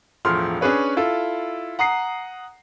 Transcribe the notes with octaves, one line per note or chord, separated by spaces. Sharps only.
E1 A2 F3 C6 F6
C#4 D4 G#4 B4 C#5
E4 F4 A4
F#5 A#5 D#6 C7